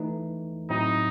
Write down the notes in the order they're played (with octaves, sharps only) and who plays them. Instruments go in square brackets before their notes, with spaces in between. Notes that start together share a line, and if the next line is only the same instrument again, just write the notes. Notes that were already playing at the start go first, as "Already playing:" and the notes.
Already playing: [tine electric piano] E3 A3 D#4
[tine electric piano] A2 F#3 C4 E4 [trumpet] D#4